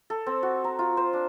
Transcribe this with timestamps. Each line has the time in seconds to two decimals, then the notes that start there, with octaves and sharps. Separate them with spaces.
0.10 A4
0.26 C4
0.43 F#4
0.64 A#5
0.79 F4
0.97 C5
1.13 D4